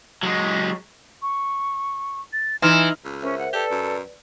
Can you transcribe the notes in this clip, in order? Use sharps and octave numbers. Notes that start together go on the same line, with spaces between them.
F#3 G#3
C#6
A6
E3 D#4 C6 F6 E7
C#2
C#4 A#4 C5 E5
F#5
G4 A4 B4 D5
F#2